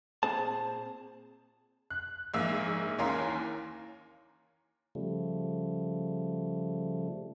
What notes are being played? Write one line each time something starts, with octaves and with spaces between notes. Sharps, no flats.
A#2 C4 G#4 C5 A5
F#6
A#1 G#2 A#3 E5 E6
D#2 E3 C#4 A#4 F5 C6
C#3 F3 G3 A3